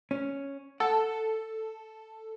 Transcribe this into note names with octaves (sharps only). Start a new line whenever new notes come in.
C#4
A4 F#5